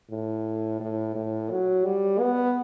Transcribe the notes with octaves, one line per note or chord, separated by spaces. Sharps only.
A2
A2
A2
F#3
G3
B3